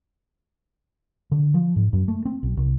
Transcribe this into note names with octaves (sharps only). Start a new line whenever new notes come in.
D3
F3
G#2
F#2
A3
C4
B1
C2